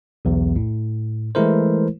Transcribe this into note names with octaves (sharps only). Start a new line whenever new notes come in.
B1 E2
A2
E3 G#3 A3 E4 A#4 C5